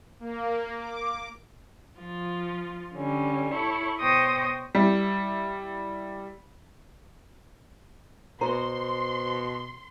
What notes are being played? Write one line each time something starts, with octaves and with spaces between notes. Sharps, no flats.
A#3
D6
F3 F4
D3 G3 C#4
E4 A4 C#5
B2 C5 C#5 G5 D#6 A#6
G3 E4
B2 C5 A#5 C6